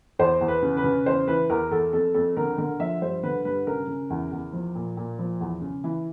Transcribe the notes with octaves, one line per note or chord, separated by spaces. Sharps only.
E2 C5
E2
B4
C#3
B4
C#3
E2 C5
E3 B4
E2 A#4
E2 A4
F2 A4
F2 A4
D3 A#4
D3 A#4
F3 E5
G2 C5
D3 B4
G2 B4
C#3 A#4
C#3
E2
E2
F3
A#2
A#2
F3
E2
C#3
E3